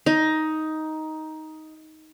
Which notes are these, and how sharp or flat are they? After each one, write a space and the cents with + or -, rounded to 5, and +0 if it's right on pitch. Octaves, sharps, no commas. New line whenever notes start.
D#4 +10